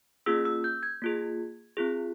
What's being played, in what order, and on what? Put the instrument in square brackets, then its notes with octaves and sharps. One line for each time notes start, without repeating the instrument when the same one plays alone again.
[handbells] A#3 C#4 F4 G#4 E6
E6
G6
G#6
A#3 F4 G#4
C4 F4 G#4